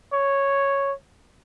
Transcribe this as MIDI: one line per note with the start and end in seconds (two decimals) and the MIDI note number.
0.13 0.92 73